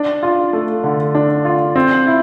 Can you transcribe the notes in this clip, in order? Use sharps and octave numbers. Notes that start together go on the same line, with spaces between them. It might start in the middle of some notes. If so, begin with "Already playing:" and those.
Already playing: D4
F4
A3
D3
D4
F4
C4
E4